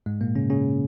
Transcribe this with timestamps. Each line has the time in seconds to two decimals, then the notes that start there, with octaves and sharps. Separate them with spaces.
0.06 G#2 G#3
0.21 A#2 A#3
0.35 C#3 C#4
0.50 C#3 C#4